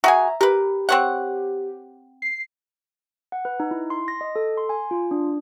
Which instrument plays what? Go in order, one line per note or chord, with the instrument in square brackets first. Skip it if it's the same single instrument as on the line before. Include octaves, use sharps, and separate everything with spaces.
[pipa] F#4 G#4 G#5 [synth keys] E5 A#5
[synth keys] G4 [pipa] A#4 B4
[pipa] C4 C#5 F#5
[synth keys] C7
[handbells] F#5
B4
D#4
E4
C6
A#6
D#5
A4
C6
G#5
F4
D4